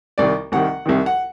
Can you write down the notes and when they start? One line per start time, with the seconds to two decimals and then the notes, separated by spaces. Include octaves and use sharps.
0.18 C2 C3 D#3 D5
0.52 C2 C3 D#3 F#5
0.86 C2 C3 D#3
1.06 F#5